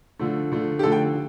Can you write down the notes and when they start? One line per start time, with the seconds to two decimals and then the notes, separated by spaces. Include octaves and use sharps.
0.19 D3 F3 A3
0.52 D3 F3 A3
0.79 G4
0.83 D3 F3 A3 A4
0.92 G5